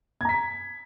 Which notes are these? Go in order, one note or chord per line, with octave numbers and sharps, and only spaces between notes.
A#5 G#6 B6